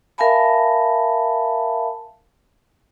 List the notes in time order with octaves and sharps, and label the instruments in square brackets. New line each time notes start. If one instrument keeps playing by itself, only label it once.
[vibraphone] A#4 E5 F5 G#5 A5 B5